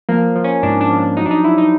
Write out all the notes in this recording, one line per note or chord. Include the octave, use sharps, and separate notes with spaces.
F3 A#3
F3
C#4
G#2 D4
D4
F3
D4
F#3 D#4
D4
D#4
F#3 E4
D#4